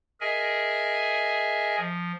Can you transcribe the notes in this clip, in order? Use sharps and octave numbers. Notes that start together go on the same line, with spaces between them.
G#4 A#4 D#5 E5 G#5
F3